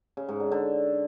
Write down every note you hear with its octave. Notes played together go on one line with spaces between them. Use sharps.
C#3
G#2
D3
D3